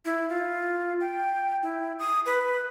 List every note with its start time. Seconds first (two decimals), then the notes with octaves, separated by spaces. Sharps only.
0.05 E4
0.29 F4
1.01 G5
1.63 E4
1.99 D#6
2.26 B4